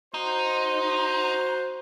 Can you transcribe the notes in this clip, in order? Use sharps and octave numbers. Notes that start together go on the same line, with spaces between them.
D#4 F#4 C5